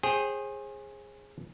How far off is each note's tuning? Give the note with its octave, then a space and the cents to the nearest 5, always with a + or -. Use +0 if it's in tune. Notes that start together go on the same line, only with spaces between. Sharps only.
G#4 -10 C5 +40 G5 +0